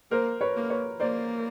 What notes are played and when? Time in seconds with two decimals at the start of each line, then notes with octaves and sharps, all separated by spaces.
0.11 A#3 A#4 C5
0.41 B4 C#5
0.56 A#3
0.70 B4 C#5
1.00 A#3 C5 D5